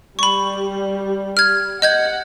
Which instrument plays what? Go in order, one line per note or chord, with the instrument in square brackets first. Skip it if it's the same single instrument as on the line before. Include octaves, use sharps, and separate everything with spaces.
[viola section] G3 [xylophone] B5 C#6
[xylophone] F6 G#6
[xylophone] D#5 G6 G#6 [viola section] F#5